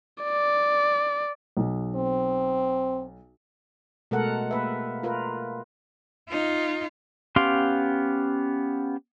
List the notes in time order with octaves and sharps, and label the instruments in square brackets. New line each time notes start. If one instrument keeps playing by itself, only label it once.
[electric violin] D5
[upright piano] B1
[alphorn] C4
[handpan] B2 G#3 A3 A4 A#4 F#5
A#3 B4 E5
F4 A#4 B4
[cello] D#4 F4
[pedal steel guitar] B3 C#4 G4 F5 C6